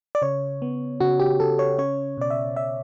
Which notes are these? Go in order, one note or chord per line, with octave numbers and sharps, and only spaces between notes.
D5
C#3 C#5
B3
C#3 F#4
G4
C#3 A4
C#5
C#4 C#5
B2 D5
E5
B2 E5